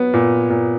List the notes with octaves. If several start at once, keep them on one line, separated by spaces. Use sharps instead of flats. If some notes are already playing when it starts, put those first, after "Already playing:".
Already playing: F#3 B3
A#2
A#2